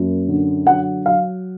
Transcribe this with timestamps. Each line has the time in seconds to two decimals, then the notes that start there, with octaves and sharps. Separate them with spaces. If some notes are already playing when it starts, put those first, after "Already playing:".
Already playing: F#2 A#3
0.28 D3
0.67 F#3 F#5
1.05 F#3 F5